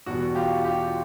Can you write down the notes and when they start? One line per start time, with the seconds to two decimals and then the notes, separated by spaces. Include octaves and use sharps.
0.06 E2 B2 G3 F#4
0.35 F4 G4
0.64 F4 G4